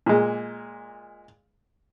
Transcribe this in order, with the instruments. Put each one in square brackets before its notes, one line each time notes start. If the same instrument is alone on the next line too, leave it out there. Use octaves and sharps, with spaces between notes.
[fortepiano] A#2 G#3